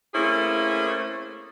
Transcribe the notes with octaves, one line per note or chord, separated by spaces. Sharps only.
A3 A#3 C4 C#4 E4 G#4